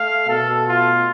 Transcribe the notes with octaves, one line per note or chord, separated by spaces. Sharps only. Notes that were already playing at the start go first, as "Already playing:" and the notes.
Already playing: A3 F5
B2 A3 A4
F4